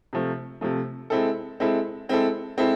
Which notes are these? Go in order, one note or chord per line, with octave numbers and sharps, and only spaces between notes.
C3 F3 A3
C3 F3 A3
G#3 C4 E4 A4
G#3 C4 E4 A4
G#3 C4 E4 A4
G#3 C4 E4 A4